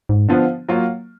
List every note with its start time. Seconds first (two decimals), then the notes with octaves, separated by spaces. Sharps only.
0.09 G#2
0.28 D3 F3 B3 F4
0.69 F#3 A#3 F4